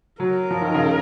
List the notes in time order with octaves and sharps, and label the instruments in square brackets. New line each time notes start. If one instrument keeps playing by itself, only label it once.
[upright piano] F#3 [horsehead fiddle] A#4
[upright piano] F3
D#3
C#3